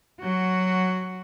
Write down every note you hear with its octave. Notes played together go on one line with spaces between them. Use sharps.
F#3 F#4